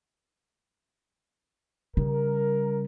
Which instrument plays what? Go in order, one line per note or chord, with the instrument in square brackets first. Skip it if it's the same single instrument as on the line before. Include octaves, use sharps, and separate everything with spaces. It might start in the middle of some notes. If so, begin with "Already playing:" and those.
[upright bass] C#3 G3 [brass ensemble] A#4